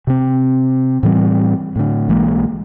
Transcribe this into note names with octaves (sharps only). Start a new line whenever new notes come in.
C3 C4
A2 E3 G3 C4
A2 D3
B1 E3 G#3 A#3